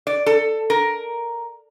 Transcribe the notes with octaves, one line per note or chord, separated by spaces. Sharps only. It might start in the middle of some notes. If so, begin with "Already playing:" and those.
D5
A4
A#4